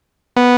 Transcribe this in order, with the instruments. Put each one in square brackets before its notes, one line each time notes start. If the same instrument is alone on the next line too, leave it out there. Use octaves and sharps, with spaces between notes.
[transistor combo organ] B3